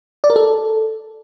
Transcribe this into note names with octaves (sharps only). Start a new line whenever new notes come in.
D5
A#4
A4